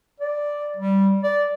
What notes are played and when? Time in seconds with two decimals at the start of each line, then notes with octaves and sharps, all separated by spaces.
0.20 D5
0.77 G3
1.23 D5